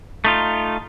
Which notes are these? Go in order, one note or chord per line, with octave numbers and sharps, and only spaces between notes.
A3 D#4 F4